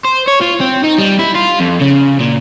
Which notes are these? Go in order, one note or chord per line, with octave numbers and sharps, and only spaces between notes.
C5
C#5
F4
C4
D#4
G3
E4
F4
F2
C#3
A#2